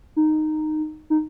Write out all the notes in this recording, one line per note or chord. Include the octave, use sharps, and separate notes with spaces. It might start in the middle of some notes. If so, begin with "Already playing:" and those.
D#4
D#4